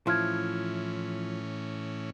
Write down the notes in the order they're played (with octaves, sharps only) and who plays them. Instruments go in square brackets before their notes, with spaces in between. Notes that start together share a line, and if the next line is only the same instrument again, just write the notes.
[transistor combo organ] A2 E3 C#4 [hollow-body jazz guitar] F3 E4 [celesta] C6 F6 G#6